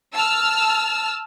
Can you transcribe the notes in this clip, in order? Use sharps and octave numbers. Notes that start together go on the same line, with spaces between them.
A5 E6 F6